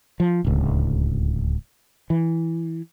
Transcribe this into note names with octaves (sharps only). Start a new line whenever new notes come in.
F3
D1 C#2
E3